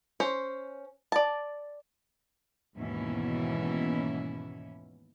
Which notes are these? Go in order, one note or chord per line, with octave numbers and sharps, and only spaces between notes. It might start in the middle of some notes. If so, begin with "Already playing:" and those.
C#4 C5
D5 A5
D#2 G#2 B2 E3 C#4 E4